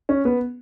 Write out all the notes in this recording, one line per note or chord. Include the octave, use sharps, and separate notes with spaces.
C#4
B3